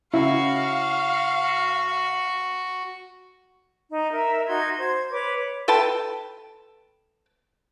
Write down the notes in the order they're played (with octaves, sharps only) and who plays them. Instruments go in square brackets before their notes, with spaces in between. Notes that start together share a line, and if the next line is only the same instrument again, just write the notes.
[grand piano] C#3 [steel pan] E4 [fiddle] F#4 [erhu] F5
[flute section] D#4
A#4 E5
D#4 F#4 C6 G#6
C5 G#6
B4 C#5 D6
[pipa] A4 B4 G5 A5